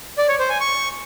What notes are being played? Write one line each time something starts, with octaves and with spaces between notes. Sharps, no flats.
D5
C#5
C5
G#5
C#6